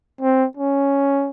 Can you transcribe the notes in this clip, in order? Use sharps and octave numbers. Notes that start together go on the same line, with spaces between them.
C4
C#4